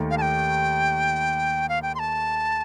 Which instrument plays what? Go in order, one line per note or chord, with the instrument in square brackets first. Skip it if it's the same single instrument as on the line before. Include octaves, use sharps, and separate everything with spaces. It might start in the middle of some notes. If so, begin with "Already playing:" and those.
Already playing: [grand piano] D#2 D#3 A3
[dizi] F5
A5
G5
F5
G5
C6
A5